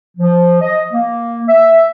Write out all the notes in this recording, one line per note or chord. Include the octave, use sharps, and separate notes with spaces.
F3
D#5
A#3
E5